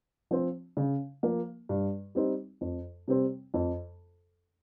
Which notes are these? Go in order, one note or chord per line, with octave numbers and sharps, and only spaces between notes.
F3 C4
C#3
F3 A#3
G2
G3 C4 D#4
F2
C3 G3 C4
F2